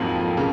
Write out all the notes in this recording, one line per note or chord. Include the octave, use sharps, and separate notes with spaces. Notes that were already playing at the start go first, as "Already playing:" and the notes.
Already playing: F2 G#2 F3 F#3 A#3
C#3 A#3